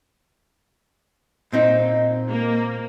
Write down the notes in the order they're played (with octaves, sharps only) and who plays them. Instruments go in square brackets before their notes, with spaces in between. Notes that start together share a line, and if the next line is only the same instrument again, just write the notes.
[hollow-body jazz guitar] A#2 C4 D#4
[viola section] A#3